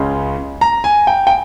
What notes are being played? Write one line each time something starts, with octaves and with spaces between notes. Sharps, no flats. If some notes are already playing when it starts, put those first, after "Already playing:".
Already playing: C#2 C#3 G#3 C#4
A#5
G#5
G5
G5